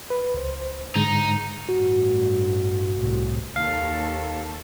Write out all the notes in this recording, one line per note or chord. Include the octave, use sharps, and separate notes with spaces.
B4
C#2 C5
G#2 D3 G#3 D#4
A1 G2 F#4
C2 A2 C3
D#2 A4 F5